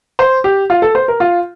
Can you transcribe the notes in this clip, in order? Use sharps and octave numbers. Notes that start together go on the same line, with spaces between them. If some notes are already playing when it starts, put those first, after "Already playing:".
C5
G4
F4
A4
C5
A#4
F4